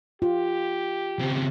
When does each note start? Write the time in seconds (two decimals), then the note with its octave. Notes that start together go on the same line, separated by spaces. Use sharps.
0.22 F4 G4
1.20 C#3 C4